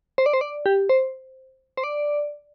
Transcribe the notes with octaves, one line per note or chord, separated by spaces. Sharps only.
C5
D5
C5
D5
G4
C5
C5
D5